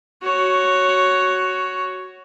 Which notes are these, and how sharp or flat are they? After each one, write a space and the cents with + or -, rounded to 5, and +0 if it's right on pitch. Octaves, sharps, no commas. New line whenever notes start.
F#4 +10 C#5 +0